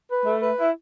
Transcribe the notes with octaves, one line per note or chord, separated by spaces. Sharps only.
B4
A3
B4
E4